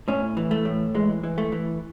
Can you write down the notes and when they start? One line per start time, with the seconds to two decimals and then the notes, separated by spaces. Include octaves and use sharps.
0.08 A2 C#4
0.37 E3
0.51 A3
0.65 A2
0.95 E3 G#3
1.24 E3
1.38 A3
1.52 E3